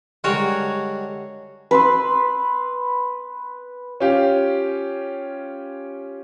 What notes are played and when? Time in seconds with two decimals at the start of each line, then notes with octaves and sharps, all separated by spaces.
0.24 D3 G3 G#3 F#4 A#4 C#5
1.71 B4 C6 E6
4.00 C#4 F4 G4 F5